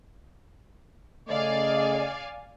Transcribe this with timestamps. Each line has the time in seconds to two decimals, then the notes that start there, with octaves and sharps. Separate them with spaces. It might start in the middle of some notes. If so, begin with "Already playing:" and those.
1.29 C#3 A3 D5 D#5 F5 G#5